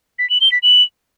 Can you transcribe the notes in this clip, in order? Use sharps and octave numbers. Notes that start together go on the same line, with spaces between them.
B6
F#7
G7
B6
F#7